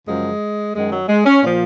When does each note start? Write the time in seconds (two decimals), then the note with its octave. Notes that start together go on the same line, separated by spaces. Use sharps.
0.07 F#2 C#3 F3 G#3
0.75 F#2 D#3 G#3
0.92 F#3
1.08 G#3
1.26 C#4
1.42 A#2 F3